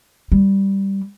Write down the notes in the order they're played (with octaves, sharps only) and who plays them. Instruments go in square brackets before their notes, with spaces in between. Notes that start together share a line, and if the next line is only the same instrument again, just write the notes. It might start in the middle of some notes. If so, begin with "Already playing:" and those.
[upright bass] G3